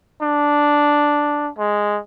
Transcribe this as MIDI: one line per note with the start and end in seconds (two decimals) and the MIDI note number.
0.22 1.50 62
1.58 2.00 56